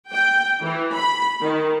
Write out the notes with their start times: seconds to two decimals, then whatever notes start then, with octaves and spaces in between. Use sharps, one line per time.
0.11 G5
0.63 E3
0.95 B5
1.41 D#3